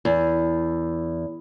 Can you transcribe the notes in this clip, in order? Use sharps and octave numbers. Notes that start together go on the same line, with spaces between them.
E2